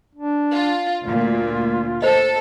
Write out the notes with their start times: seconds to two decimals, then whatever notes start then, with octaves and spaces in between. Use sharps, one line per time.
0.15 D4
0.53 F4
1.03 D2 A#2 F4
2.02 A4 C5 D#5